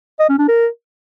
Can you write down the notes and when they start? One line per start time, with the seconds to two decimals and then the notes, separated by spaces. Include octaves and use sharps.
0.19 D#5
0.29 C#4
0.39 D4
0.48 A#4